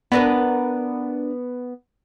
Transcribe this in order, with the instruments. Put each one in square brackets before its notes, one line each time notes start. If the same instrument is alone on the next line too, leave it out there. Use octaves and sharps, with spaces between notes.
[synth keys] B3 [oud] D4 A#4 B4